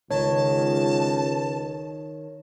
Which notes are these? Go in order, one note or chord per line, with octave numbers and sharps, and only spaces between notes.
C#2 D#3 C#5 A5